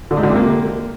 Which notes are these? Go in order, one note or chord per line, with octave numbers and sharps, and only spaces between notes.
D3
G#2
D3
C3
A#3